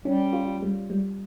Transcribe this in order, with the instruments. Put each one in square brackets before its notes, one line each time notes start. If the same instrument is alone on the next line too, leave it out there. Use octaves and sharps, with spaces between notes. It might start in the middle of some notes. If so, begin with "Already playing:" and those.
[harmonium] G3 [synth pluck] C#4
[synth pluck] F4
G3
G3